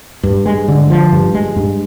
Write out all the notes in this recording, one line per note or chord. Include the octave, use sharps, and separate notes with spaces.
G2
G#3
D3
F3
G2
G#3
G2